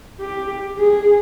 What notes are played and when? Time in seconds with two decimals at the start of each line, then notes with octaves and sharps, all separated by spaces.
0.21 G4
0.79 G#4